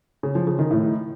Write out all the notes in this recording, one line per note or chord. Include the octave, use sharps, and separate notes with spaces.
C#3
F3
C#3
D#3
A2